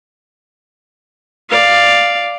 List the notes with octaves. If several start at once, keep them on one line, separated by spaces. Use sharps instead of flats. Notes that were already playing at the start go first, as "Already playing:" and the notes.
D5 F5